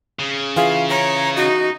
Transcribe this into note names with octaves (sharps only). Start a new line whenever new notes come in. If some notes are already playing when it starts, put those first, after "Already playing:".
C#3
E3 F4 G#4 F5
C#5 A#5
D#4 F#4